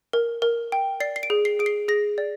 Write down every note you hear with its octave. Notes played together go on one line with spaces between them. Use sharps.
A#4
A#4
G5
D5 C7
C7
D7
G#4
C7
G#4 D7
C7
G#4 A#6
D5